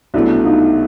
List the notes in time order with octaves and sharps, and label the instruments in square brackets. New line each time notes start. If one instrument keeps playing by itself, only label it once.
[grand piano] C2 B2 F#3 A3 [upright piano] D4 E4
[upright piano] D#4 F4